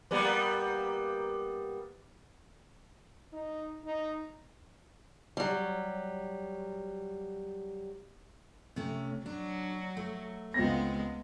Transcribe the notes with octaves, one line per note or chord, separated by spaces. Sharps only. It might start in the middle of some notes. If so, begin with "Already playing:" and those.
G3 A#3 B3
D#4
D#4
F#3 G3
C3 A3 C#4
F#3 D4
A3
C#2 G#3 B3 C4 A#6